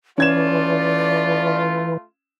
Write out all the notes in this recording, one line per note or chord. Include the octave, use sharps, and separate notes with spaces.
E3 A3 C#4 F4 D5 G#6 E7